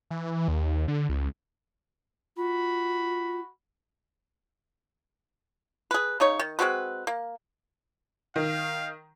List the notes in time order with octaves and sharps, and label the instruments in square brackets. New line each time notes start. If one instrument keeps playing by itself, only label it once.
[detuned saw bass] E3
D#2
D3
C#2
[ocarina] F4 [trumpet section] F#4 B5
[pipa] G#4 B4
C#3 D#4 C#5
D#3
G#3 C4 F#4 B4
A#3
[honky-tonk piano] D#3 [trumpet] F5